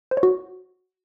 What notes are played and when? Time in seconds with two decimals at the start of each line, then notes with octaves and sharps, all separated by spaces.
0.11 C5
0.17 C#5
0.23 F#4